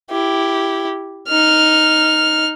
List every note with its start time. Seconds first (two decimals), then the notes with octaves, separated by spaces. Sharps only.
0.10 E4 G4
1.28 D#4 F6